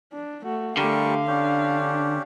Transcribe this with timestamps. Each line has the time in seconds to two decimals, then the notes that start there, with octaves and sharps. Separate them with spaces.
0.12 D4
0.45 A3 F#4
0.77 D3 G3 A3 G4 A#4 F5 C#6
1.27 C#4 D4 G4